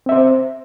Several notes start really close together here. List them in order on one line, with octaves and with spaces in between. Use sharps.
C4 E5 C5